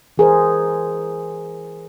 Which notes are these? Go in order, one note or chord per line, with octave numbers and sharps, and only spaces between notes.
E3 G#4 A#4 C5